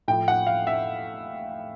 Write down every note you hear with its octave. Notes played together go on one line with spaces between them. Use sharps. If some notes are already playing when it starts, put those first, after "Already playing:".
A2 F3 G5
F#5
F5
E5